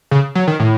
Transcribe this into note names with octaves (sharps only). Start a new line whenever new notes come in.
C#3
F#3
D#3
A2